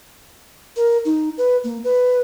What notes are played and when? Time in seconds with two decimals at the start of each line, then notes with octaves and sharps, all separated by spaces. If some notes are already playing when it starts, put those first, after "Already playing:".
0.76 A#4
1.05 D#4
1.38 B4
1.64 A#3
1.84 B4